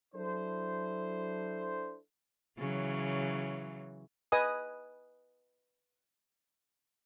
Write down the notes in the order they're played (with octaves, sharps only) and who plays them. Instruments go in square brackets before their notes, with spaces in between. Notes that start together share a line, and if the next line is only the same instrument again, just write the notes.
[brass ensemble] F#3 D4 E4 A4 C5
[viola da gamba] C#3 E3 F#3
[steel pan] B4 D#5 G#5 D#6